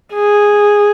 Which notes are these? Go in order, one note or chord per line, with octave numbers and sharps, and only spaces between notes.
G#4